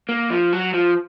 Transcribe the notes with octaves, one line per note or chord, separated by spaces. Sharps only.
A#3
F3
F#3
F3